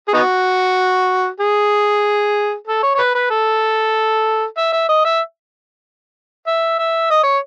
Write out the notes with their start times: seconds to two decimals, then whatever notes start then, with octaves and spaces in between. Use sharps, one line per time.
0.08 G#4
0.14 B3 D#4 F#4
1.40 G#4
2.68 A4
2.83 C#5
2.95 C#5
2.99 B4
3.15 B4
3.30 A4
4.57 E5
4.73 E5
4.89 D#5
5.05 E5
6.48 E5
6.79 E5
7.11 D#5
7.24 C#5